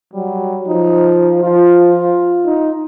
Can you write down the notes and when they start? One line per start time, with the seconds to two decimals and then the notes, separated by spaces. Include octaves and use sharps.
0.14 F#3 G3
0.68 F3 D#4
1.44 F3 F4
2.45 D#4